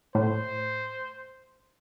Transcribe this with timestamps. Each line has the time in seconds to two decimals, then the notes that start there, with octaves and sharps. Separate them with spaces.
0.15 A2 C5